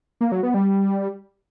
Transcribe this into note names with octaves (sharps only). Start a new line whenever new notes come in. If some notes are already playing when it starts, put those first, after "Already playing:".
A#3
F#3
B3
G3